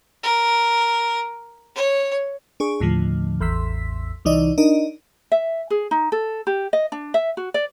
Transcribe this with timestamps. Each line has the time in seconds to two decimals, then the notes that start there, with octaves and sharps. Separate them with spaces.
0.23 A#4
1.75 C#5
2.60 D4 G#4 C#6
2.80 D#2 A2 D3 F3
3.41 A1 E2 C6 E6 B6
4.25 C2 E3 D#4 D5 D#5
4.58 D4 D#4 A#4 D#5
5.32 E5
5.70 G#4
5.91 D#4
6.12 A4
6.47 G4
6.73 D#5
6.92 D4
7.14 E5
7.37 F#4
7.54 D5